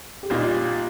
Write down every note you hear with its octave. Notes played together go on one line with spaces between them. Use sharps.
G4
A#1 A#2 G3 A#3 D#4 F4